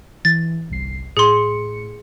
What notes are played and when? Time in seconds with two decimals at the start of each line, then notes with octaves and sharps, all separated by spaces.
0.25 E3 A6
0.69 G1 C2 C7
1.17 A2 G#4 C6 C#7